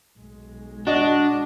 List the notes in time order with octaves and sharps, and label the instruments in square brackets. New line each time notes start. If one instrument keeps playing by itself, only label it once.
[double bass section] B1 G#3
[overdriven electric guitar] D4 [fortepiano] F#4 D#5